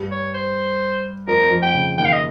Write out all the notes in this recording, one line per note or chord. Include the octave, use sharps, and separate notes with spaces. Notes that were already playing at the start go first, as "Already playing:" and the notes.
Already playing: G2 G3
C#5
C5
F2 F3 A#4
F2 F3
G5
C#3
D#2 D#3 G5
F5
D#5